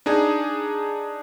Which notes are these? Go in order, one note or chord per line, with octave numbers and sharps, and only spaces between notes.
D4 D#4 G#4